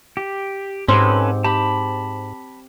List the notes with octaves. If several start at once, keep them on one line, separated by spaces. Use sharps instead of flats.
G4
G#2 C4 C#4 G4 A4 B4
G4 A5 B5